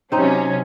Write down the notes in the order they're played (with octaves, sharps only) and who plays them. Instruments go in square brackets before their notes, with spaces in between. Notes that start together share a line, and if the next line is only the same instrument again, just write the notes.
[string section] C3 F#3 C#4 [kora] C4 D#4